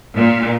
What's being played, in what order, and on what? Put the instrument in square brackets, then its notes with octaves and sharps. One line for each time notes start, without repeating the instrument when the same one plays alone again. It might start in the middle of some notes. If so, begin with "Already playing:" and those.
[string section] A#2